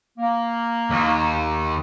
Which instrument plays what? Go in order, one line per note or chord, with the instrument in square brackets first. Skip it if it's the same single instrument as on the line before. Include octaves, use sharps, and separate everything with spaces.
[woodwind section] A#3
[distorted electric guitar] D#2